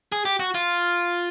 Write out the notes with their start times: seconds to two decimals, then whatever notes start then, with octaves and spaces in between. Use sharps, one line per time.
0.12 G#4
0.25 G4
0.40 F#4
0.55 F4